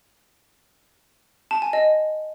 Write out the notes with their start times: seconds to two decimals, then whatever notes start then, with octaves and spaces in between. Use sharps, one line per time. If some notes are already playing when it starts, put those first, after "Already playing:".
1.51 A5
1.62 G#5
1.73 D#5